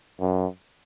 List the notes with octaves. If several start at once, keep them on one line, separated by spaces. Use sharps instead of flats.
F#2